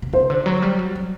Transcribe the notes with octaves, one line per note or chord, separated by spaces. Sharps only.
C3
C#3 C5
D3
F#3
G3
F#3
F#3